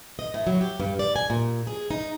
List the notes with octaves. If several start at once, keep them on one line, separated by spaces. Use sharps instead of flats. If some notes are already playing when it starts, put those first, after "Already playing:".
D#5
A2
F#3
G4
G2
D5
G#5
A#2
G#4
D#4